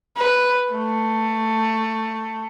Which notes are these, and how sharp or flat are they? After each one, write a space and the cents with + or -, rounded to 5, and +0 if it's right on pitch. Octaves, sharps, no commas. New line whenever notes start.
B4 +0
A3 +15